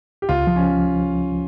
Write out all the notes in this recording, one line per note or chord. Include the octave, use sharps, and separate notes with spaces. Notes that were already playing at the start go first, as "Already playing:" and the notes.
G4
C#2 F4
F3
C#4